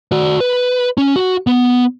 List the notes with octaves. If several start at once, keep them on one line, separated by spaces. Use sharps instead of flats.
F#4 D5
B4
C#4
F#4 F#5
B3